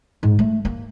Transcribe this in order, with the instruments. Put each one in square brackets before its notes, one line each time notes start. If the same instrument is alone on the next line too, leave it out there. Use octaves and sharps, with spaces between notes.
[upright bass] G#2
A3
A#3